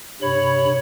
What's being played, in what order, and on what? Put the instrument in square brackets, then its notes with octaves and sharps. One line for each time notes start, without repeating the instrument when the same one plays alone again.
[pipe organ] G2 C3 B5 [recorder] C#5